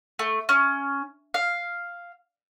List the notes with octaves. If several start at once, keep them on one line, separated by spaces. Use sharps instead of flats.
A3
C#4
F5